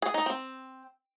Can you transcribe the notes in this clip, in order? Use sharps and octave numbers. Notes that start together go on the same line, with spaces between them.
G#4
D#4
C4